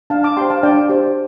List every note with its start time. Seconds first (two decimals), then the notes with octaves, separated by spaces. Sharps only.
0.10 D4 F5 A5
0.23 A5 D6
0.37 G4 C5 G5 C6
0.50 F5 A5
0.63 D4 D5 G5
0.89 G4 C5